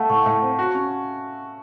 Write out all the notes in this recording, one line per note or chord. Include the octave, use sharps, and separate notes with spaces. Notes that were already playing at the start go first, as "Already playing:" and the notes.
Already playing: A3 F5 F#5 A5
A2 C#6
A2
C4
F#4
C#4